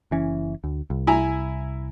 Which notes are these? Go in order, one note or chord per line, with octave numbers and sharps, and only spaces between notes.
F#1 E3 C#4
D2
C2
E4 G#5 A#5